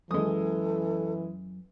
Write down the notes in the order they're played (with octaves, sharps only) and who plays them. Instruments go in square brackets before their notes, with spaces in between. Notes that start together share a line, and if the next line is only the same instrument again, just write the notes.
[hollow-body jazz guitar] F#2 [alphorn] E3 [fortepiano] G#3 D#6 [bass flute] A4